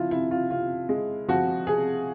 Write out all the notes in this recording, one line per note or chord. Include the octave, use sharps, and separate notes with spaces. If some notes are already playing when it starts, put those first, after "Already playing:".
Already playing: F3 E4 F4
C3 E4
F4
C3 F4
G#3
F3 F#4
C3 G#4